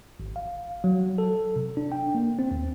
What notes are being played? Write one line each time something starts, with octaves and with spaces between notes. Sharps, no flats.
G#1
F5
F#3
A4
C3
D4
G5
A#3
C4
D#2